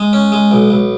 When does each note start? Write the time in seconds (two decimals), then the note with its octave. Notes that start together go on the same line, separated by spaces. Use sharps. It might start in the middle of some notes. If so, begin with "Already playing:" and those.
Already playing: G#3
0.13 C#4
0.32 G#3
0.51 B1
0.70 B1